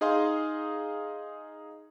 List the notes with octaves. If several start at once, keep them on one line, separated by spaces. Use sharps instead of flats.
D#4 G#4 D#5 F5 C6